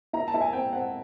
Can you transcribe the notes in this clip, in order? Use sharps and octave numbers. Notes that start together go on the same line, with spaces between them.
E4 A#5
A5
E4
G#5
C4 G5
C4 F#5